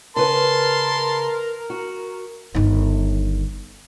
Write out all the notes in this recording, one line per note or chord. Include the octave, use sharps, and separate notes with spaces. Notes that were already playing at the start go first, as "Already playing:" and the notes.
C#3 A#4 B4 A5 C6
F#4
G1 D#3